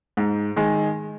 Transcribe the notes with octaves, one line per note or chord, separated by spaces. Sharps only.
G#2
D#3 G#3